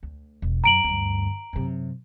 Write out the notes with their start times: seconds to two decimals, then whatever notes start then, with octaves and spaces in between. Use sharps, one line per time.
0.03 D2
0.42 E1
0.64 F#2 A#5 D7 F#7
0.84 D2 G2
1.53 F#2 C3